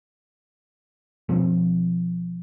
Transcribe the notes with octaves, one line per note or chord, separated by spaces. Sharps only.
B2 F3 C4